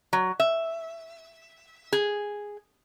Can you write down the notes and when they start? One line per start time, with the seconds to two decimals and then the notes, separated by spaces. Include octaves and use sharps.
0.13 F#3
0.40 E5
1.93 G#4